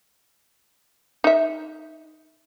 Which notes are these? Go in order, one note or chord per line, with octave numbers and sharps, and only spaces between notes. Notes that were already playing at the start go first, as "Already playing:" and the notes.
D#4 E5